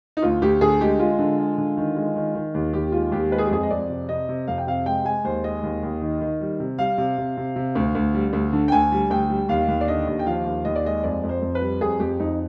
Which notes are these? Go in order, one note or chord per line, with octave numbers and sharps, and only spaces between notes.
D#4
D2 F4
D2 G4
D3 G#4
G#3 G4
G#3 F4
D3
G#3
D3
D#3
G#3
D#3
D#3
D#2
D#2 G4
G#3 F4
D#2 G4
G#3 B4
G#4
G4
F2 G#4
D#5
F2 D5
C3
C3 D#5
C3
F2 F5
G5
C3 F5
G#3 G5
G#3 G#5
D#2 C5
G#3 D#5
D#2
D#2
D#3
D#3
G3
C3
G3 F5
C3
C3
C3
C3
D2
D2
G3
D2
D3
G5
D2 G#5
G3
D2 G5
G3
D#2 F5
D#2
D5
D3 D#5
D#2
G5
F3 F5
D#2
D#2 D#5
D5
G#3 D#5
F2 D5
F2
C5
F2
B4
G3
F2 G#4
F2 G4
F2 D#4